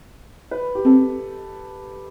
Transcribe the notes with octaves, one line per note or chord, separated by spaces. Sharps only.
B4
G4
C4 A4